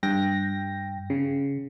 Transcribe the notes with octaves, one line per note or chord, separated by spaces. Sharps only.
G2 G5 A#6
C#3